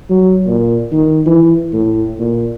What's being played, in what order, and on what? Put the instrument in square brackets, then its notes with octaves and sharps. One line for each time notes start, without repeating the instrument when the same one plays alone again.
[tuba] F#3
A#2
D#3
E3
A2
A#2